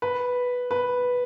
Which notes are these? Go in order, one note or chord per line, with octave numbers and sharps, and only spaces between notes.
B4
B4